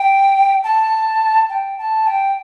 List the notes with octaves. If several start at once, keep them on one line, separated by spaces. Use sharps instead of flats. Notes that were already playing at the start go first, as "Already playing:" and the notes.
Already playing: G5
A5
G5
A5
G5